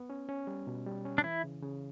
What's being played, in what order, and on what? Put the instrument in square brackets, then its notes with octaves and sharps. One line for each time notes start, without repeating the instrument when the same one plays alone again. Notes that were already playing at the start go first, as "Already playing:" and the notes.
Already playing: [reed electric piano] B3
C#4
C#4
G3
B2
G3
C#4
[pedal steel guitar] D4
[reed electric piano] E3 [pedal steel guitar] E4
[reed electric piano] C#3
C#3